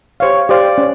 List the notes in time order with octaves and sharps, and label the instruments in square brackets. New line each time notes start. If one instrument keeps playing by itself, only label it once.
[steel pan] G4 C5 F5 [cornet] C#5
[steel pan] G4 C5 F5 [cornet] D5
[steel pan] C#4